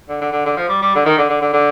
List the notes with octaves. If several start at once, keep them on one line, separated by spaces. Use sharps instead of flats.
D3
D3
D3
D3
F3
G3
G3
D3
D#3
D3
D3
D3
D3